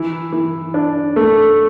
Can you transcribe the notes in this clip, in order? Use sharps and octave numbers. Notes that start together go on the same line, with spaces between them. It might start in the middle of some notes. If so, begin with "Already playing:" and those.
Already playing: E3
E3
D4
A3